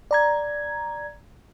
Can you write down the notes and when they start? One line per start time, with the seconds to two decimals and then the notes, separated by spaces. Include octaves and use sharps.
0.11 D5 A#5 G#6